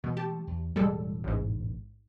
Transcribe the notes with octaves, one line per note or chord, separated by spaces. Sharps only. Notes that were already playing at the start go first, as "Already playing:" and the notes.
B2 E3 G#3 A3
G4 A5
E2
E1 A2 E3 G3 G#3 A4
A1 G#2